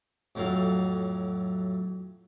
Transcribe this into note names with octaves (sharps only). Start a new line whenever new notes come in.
F2 A2 F#3 F5